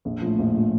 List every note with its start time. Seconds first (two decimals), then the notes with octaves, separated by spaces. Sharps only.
0.05 A#1
0.22 A2 F3
0.39 A#1
0.55 A2 F3